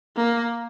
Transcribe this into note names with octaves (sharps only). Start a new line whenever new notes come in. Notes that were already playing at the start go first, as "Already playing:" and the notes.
A#3